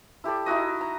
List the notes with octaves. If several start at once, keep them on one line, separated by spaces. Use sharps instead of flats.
E4 G4 A4 D5
D#4 E4 F#4 D#5
A#5